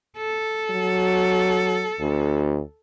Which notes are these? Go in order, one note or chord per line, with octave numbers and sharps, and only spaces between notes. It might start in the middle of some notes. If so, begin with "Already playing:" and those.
A4
F#3
D2